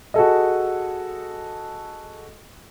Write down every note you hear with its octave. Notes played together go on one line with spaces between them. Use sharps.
F#4 G#4 A4 D#5